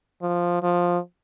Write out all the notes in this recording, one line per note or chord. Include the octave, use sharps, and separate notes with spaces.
F3
F3